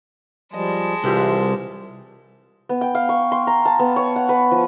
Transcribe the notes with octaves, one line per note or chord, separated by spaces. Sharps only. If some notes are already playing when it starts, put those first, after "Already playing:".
F3 G3 G#3 D#5 A5
C2 E3 F4 G4 B4
B3
G5
F5
C#6
C6
A#5
A5
B3
C#5
F#5
B4
F3